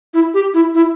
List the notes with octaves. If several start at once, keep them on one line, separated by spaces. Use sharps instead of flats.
E4
G4
E4
E4